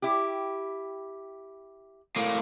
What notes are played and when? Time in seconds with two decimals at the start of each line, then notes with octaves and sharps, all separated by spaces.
0.02 E4 G4
2.16 A2 A#3